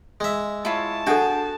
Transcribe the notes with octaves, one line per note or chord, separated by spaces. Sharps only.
G#3 E5
E4 F4 C#5 A5
D4 F#4 G#4 A4 G5